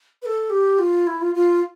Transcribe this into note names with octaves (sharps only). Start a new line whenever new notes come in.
B4
A4
G4
F4
E4
F4
F4